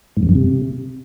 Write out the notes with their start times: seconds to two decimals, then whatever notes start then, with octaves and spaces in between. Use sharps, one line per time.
0.17 G#2
0.23 F2
0.29 G2
0.35 C3